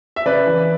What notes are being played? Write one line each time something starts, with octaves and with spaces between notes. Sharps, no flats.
E5
C#3 B4 D5
E3